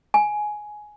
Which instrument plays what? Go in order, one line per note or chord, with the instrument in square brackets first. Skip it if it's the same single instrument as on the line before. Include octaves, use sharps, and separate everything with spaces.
[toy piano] G#5